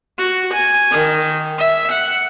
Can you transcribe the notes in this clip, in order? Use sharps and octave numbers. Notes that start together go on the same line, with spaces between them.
F#4
G#5
D#3
E5
F#5